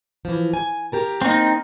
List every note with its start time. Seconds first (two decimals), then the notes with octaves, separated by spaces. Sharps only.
0.25 E3 F3
0.54 G#5
0.92 G4 A#4 A5
1.22 A#3 C4 D#4